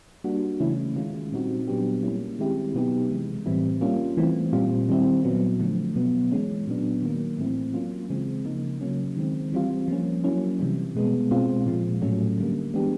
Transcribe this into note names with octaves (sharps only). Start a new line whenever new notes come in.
G3 A#3 D4 F#4
C#3 E3 A3 C#4 E4
D#3 G#3 C#4 F4
A#2 G3 C4 D#4 F#4
A#2 F#3 B3 D4 G4
G3 A#3 C#4 E4
D#3 G#3 C4 E4 G4
B2 F#3 B3 D#4 G4
C3 E3 G#3
A2 E3 G3 C4 E4
G3 A#3 C#4 F4
E3 A3 C4
A#2 G3 C4 F4
D#3 G3 C4 E4
A#2 F#3 B3
D3 F3 A3
B2 F#3 B3
E3 G#3 C#4
A#2 F#3 B3 D4
D#3 F#3 A#3
A2 E3 A3 C4 E4
F#3 A#3 C#4 F4
C#3 E3 G#3 C4
C#3 F3 A#3 D#4
C#3 F#3 A#3 C#4
D#3 G#3 C4
E3 G3 C4 F4
F3 A#3 C#4
F#3 A#3 C#4 E4
C3 E3 G3
B2 G#3 B3
B2 G#3 C4 F4
A#2 F3 G#3
A2 F#3 A3 C#4
D3 G3 A#3
E3 G#3 B3 D4 G4